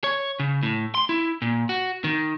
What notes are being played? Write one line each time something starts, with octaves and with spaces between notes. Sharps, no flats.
C#5
C#3
A2
C6
E4
A#2
F#4
D#3